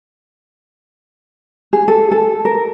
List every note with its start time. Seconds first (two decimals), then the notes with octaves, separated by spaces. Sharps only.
1.73 G#4
1.88 A4
2.11 A4
2.45 A#4